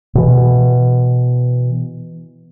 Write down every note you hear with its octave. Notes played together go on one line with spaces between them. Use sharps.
B2 E3